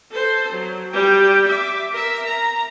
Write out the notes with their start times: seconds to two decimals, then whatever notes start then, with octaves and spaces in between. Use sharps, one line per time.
0.11 A4 C5
0.52 F#3
0.91 G3 G5
1.47 E5 D6
1.91 A#4 E5
2.26 A#5